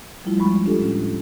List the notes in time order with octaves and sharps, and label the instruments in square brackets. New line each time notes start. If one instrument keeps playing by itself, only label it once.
[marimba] F3 G3 A3 E4 F4
D2 F3 G3 G#3 B5 C#6
D4 F4 G4 A4
A2 C#4